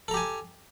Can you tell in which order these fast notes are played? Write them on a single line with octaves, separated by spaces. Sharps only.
A4 A#5 G4 G#5